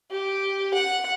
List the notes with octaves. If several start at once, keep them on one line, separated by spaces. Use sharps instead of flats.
G4
F#5